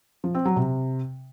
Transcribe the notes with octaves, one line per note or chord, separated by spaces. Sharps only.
F3
C4
F#3
C3